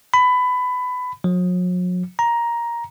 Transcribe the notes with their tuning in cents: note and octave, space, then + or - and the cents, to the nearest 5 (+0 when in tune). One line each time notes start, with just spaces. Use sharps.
B5 +20
F#3 -45
A#5 +10